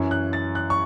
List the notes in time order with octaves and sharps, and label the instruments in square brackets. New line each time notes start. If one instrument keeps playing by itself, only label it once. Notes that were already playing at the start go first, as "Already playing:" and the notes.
Already playing: [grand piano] F#2 E3 C#4
F#6
A6
F#6
C#6